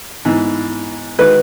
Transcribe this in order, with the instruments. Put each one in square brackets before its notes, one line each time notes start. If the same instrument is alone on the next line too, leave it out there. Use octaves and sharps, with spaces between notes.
[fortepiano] G#2 E3 B3
[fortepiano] D#3 G#3 D#4 F#4 [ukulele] B4